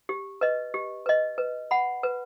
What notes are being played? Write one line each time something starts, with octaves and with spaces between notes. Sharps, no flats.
G4
B4 D#5
G4
B4 D#5
B4
F#5 B5
B4